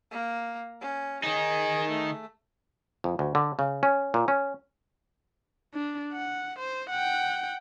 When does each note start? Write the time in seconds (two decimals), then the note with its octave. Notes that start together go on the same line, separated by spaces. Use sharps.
0.11 A#3
0.81 C#4
1.23 D#3 D#4 G#4
1.89 A3
3.04 F2
3.19 D2
3.35 D3
3.59 C#3
3.83 C#4
4.14 A#2
4.28 C#4
5.74 D4
6.13 F#5
6.59 C5
6.90 F#5 G5